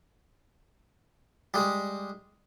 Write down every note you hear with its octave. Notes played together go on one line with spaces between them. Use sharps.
G3 G#3